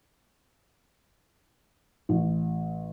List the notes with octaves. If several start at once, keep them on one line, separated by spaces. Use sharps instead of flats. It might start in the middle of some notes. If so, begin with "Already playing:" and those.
A1